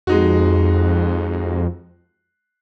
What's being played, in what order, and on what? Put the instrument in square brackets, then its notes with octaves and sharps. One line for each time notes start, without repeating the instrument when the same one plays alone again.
[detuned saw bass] F2 [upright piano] G#3 D#4 F#4